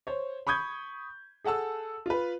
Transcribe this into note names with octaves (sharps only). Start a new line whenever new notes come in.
C5 C#5
B5 C#6 D#6 G6 G#6
G#4 A4 F#5 A5 E6
F4 B4